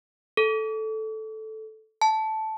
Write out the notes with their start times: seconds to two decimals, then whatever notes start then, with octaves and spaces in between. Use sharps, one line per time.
0.37 A4
2.01 A5